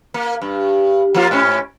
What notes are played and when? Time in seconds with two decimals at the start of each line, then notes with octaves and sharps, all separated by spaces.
0.14 A#3
0.42 G2
1.14 F3 A#3 F4
1.31 G#2 C#4